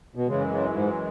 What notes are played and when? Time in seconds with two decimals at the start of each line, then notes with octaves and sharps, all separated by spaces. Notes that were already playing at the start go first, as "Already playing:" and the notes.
0.16 B2
0.27 F#2 C#3 E3 G#3
0.50 C#3
0.73 G#2